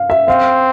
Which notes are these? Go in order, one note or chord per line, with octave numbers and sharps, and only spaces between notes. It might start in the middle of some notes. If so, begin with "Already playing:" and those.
Already playing: F5
E5
C4 F5